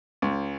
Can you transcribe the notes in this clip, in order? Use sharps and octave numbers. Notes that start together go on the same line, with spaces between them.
C#2